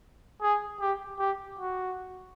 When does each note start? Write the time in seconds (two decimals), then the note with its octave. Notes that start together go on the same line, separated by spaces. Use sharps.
0.42 G#4
0.80 G4
1.19 G4
1.59 F#4